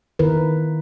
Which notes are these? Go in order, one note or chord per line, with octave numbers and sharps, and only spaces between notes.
D#3 E4 A#4 B4